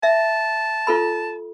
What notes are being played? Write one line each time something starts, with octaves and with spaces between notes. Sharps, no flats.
E5 A5
F4 A4 B5